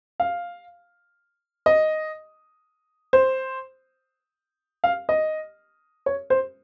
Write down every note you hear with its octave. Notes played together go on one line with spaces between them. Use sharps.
F5
D#5
C5
F5
D#5
C#5
C5